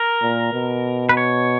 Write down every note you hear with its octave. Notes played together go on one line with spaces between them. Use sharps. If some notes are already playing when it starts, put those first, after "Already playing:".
Already playing: A#4
A#2
B2
B4
C#5